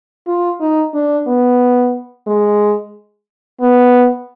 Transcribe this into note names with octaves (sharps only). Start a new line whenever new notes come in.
F4
D#4
D4
B3
G#3
B3